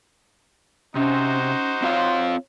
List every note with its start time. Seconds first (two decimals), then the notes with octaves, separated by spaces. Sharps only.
0.95 C3 C#4 D#4 F#4 C5
1.43 C#4
1.82 C4 F4 C#5 F5